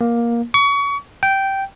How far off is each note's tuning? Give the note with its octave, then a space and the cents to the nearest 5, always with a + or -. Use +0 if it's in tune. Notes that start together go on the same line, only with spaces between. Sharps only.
A#3 +10
C#6 +30
G5 -10